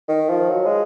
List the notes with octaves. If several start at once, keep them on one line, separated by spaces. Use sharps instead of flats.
D#3
F3
F#3
G#3